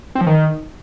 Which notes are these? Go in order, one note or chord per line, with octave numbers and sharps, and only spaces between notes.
C4
F3
D#3